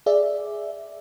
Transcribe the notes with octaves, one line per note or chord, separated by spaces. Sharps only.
G#4 D5 E5